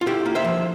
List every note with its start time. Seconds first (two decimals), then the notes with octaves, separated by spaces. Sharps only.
0.01 F4
0.06 D3 E4 G4
0.26 A#3
0.35 C5 E5
0.45 F3